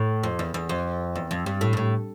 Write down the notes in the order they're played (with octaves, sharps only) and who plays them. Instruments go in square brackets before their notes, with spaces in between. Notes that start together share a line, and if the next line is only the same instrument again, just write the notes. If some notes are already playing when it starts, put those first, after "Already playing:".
Already playing: [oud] A2
F2
E2
E2
F2
E2
F2
G2
A2
G2
A2